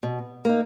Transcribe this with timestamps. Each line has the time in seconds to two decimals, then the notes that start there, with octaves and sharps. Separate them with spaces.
0.03 B2
0.45 A#3 D#4